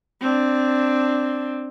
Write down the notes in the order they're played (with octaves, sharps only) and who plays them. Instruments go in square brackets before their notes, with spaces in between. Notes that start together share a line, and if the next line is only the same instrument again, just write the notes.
[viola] C4 D4